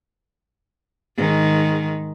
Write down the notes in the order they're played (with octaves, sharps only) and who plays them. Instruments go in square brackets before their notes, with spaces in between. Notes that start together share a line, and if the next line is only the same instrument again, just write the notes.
[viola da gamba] G#2 D#3